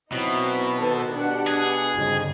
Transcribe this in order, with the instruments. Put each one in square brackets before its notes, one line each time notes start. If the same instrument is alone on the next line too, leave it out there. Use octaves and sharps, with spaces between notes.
[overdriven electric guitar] B2 [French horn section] F#3 C4 [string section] D#4 E4
[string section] D#3 A4 C5 [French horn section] B4
[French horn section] B2 [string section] D4 G4 F#5
[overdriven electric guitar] G#4
[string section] G1 C#3 [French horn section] F2 D#4